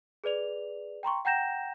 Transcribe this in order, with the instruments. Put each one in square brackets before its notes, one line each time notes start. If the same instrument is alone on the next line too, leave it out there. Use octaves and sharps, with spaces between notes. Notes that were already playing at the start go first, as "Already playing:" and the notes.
[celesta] G#4 B4 D5 F7
G5 A#5 C6 C#6
F#5 G5 A#5 G6 A#6 E7